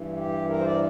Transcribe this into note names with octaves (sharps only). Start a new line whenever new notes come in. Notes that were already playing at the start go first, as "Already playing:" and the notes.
Already playing: G2 E3
G4
A#4
C5
D5